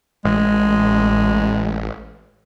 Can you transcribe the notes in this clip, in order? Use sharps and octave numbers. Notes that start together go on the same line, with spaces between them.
A1 G#3